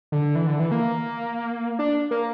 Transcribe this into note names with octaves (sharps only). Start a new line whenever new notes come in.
D3
E3
D3
E3
A#3
D4
A#3